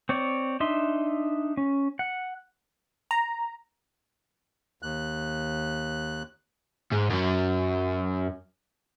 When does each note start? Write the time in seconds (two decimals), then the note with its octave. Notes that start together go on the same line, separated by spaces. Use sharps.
0.09 C4 C#5 D5
0.60 D4 D#4 E5 C6
1.57 C#4
1.99 F#5
3.11 A#5
4.83 D#2 F#6
6.92 G#2
7.10 F#2 F#3